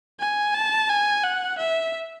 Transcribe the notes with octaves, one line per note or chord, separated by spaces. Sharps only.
G#5
A5
G#5
F#5
E5